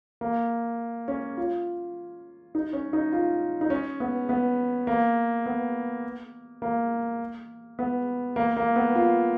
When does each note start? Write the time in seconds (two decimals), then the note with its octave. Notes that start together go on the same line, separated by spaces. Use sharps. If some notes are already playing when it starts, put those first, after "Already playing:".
0.21 A#3
1.08 C#4
1.37 F4
2.55 D#4
2.73 C#4
2.93 D#4
3.12 F4
3.61 D#4
3.70 C#4
4.00 B3
4.29 B3
4.87 A#3
5.46 B3
6.62 A#3
7.79 B3
8.36 A#3
8.57 A#3
8.76 B3
8.95 F4